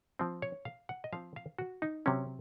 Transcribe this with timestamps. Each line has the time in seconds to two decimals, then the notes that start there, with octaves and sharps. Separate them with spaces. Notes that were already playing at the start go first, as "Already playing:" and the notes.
0.19 F3 C4
0.42 C#5
0.65 F5
0.89 F#5
1.04 D#5
1.13 F3 C4 F5
1.36 F5
1.59 F#4
1.82 D#4
2.06 C3 F#3 C4 C#4